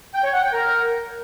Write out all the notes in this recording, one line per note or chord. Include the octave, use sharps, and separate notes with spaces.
G5
C#5
F#5
G5
A#4